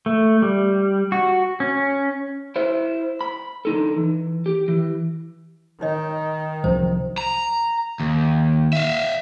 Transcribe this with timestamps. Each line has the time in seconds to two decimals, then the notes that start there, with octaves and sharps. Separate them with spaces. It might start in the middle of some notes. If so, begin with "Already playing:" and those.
0.06 A3
0.42 G3
1.12 F#4
1.60 C#4
2.56 E4 C5 E5
3.21 B5
3.65 D3 D#4 A4
3.96 E3
4.46 G4
4.68 E3
5.81 D#3 D#4 C#5 D#5
6.64 C2 F3 F#3 C5
7.18 A#5
8.00 D#2
8.73 E5 F5